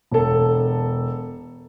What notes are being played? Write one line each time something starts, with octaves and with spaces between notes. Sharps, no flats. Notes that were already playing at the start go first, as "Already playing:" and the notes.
E1 A4